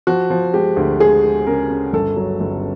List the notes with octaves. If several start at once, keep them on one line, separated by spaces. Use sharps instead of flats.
F3 F#4
F3
G#3 G4
D2
G#3 G#4
G#3
C#3 A#4
C#3
G1 A4
F#3
G1